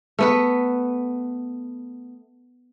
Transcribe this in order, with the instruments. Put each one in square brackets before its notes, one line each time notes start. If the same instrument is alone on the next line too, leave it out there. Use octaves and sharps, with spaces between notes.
[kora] A3 B3 B4